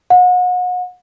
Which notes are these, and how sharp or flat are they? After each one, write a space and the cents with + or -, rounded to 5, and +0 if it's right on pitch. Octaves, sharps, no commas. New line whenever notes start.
F#5 -35